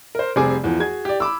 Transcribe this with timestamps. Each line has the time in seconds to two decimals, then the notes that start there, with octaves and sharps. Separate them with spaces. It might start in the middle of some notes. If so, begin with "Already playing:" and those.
0.15 A#4 C5
0.36 F1 G3 C4 G#4 G#5 D6
0.64 E2 E3 F3
0.79 F#4 G#4 G#6
1.05 G4 D5
1.20 B5 D6 E6